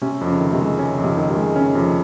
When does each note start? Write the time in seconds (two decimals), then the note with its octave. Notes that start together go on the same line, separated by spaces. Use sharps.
0.02 C3 C#4
0.21 F2
0.27 C#3
0.40 D#3
0.53 C3
0.60 G#3
0.78 C#3 C#4
0.98 F2
1.04 C3
1.17 D#3
1.29 C3
1.36 G#3
1.56 C#3 C#4
1.74 F2 C3